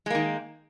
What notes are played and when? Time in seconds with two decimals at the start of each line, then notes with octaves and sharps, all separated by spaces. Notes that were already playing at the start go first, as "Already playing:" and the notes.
0.06 G#3
0.10 A#3
0.15 D#3